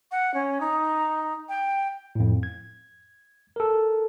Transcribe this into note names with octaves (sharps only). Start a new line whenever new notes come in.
F#5
C#4
D#4
G5
F2 A2
G#6
A4 A#4